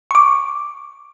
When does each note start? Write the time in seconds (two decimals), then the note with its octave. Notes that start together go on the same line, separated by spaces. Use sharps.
0.11 C#6 D6